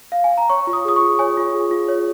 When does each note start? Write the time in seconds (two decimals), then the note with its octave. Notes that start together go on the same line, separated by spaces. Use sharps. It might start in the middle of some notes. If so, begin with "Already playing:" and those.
0.12 F5
0.24 G#5
0.37 A#5
0.49 C#5 C#6
0.67 F4
0.73 D#6
0.85 G#4 D#6
0.96 C#6
1.02 F4
1.19 C#5 G#5
1.37 F4
1.55 G#4
1.71 F4
1.88 C#5